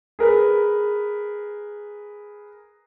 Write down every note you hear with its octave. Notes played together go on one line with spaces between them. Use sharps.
G#4 A#4 B4